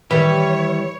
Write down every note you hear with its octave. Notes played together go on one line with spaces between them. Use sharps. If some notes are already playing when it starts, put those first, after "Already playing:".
D#3 E3 G3 B4 C#5